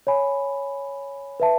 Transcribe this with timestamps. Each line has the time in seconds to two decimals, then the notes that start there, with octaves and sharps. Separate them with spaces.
0.07 C#5 G#5 B5
1.40 B4 E5 A5